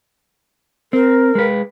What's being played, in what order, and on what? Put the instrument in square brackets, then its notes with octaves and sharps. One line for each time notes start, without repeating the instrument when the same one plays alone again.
[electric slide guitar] C4 [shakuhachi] A#4
[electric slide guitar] G#3 B4